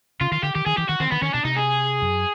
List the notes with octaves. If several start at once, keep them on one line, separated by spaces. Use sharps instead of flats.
C#3 F4
D#3 F4
D3 G4
D#3 G4
D#3 G#4
E3 G4
D#3 F#4
D#3 C4
D#3 B3
D#3 C#4
B2 D4
C3 D#4
G#4
F#2